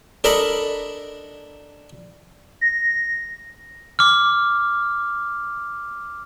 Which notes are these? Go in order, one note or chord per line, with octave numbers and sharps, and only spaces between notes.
D4 A4 A#4 D#5 B5
A#6
D6 F6